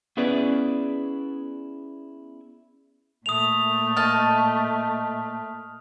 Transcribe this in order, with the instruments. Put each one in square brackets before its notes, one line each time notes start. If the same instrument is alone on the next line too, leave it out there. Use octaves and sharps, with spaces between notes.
[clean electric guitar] B3 C#4 E4 G#4 B4 D5
[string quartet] A#2 A3 [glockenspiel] D#6 F7
[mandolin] D#5 A5 [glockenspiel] F6